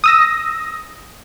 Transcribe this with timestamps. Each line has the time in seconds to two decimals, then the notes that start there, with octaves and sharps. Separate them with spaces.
0.04 D#6 E6 A#6